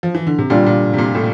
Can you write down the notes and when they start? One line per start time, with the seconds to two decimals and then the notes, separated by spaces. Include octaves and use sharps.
0.03 F3
0.15 E3
0.27 D3
0.38 C3
0.50 A#2 D3 G3 D4 F4
0.66 A#2
0.93 C3
0.98 A#2
1.15 A2